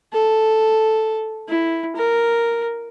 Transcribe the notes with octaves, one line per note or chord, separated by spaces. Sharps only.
A4
E4
A#4